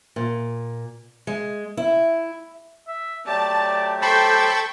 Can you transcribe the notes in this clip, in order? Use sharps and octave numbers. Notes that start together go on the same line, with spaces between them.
A#2
G#3
E4
E5
F#3 A3 G4 D5 A5
A4 C5 G5 A5 B5 C#6